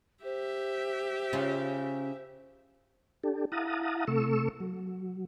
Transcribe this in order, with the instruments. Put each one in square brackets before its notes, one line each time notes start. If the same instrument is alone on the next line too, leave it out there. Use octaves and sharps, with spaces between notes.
[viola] G4 E5 [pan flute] C5
[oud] C#3 C#4 F4
[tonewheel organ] D4 G4 A4
E4 F5 F#5 A5 A#5 D#6
C3 A3 A4 C#6 E6
F#3